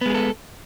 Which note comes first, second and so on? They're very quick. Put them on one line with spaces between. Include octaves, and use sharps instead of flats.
B3 G#3 G#4 A4